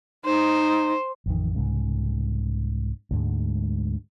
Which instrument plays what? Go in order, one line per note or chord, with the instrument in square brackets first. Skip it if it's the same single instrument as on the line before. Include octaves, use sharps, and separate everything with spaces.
[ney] D#4 [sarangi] C5
[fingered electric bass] A1 F2 D#3
C2 G#2 C#3
D2 G#2 G#3